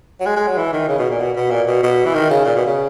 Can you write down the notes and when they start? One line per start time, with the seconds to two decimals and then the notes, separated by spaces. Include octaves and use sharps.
0.20 F#3
0.26 G#3
0.36 G#3
0.47 F#3
0.58 E3
0.73 D#3
0.88 C#3
0.99 B2
1.10 A#2
1.20 B2
1.36 B2
1.51 A#2
1.67 B2
1.83 B2
2.06 E3
2.14 D#3
2.30 C#3
2.45 A#2
2.56 B2
2.66 C#3